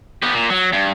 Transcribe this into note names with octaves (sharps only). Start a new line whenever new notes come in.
B3 G4
A#2
F#3
G2